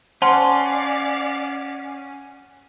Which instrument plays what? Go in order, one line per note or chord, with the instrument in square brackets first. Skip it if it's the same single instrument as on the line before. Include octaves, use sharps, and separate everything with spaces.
[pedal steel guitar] C#4 [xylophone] C5 A5 C6 [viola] D5 F5 [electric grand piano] F#5